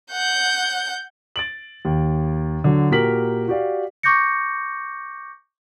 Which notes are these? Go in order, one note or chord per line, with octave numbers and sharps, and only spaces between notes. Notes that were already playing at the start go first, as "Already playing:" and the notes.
F#5 G6
A6 D7 F#7
D#2
D3 F#3
A#2 F#4 G4 A#4 B6 F#7
F#4 G4 D5 F5
C#6 D6 G6 A#6 C#7